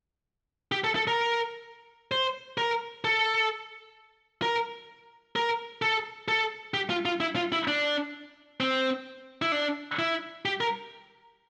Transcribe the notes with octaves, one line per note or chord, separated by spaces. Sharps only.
G4
A4
A4
A#4
C5
A#4
A4
A#4
A#4
A4
A4
G4
F4
F4
E4
F4
E4
D4
C4
E4
D4
E4
G4
A#4